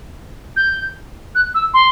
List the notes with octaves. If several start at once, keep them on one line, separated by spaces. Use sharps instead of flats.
G6
F#6
E6
C6